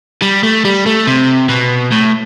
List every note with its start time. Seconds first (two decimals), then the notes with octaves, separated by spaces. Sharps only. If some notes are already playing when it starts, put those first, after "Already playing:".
0.22 G3
0.43 A3
0.65 G3
0.86 A3
1.07 C3
1.49 B2
1.92 A2